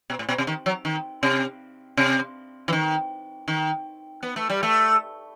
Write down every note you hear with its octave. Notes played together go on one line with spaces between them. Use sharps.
B2
A2
B2
C3
D#3
F#3
D#3
C3
C3
E3
D#3
D#3
B3
A3
G3
A3